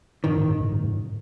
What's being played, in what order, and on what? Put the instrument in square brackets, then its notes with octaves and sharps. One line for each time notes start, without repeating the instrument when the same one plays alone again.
[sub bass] F#2 [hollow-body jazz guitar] D#3
[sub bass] G#2
F#2
G#2
F#2
G#2